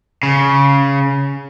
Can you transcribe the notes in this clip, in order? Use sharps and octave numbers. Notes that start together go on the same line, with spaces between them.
C#3